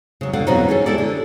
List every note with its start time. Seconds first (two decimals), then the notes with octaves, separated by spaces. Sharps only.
0.21 C#3 F#3
0.33 D3 F5 F#5
0.47 E2 B2 F#3 G3 C4 D#4
0.69 C#4 G#4 A4
0.86 E4 G4 A4 D5
0.98 D3